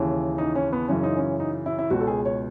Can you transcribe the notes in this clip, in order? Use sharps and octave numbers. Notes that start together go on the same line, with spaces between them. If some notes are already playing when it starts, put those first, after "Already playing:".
Already playing: D#2 C#3 E3
D#4
C#4
B3
F#2 C#3 E3 C#4
D#4
C#4
D#4
E4
E4
C#2 B2 F#4
A4
G#4
C#5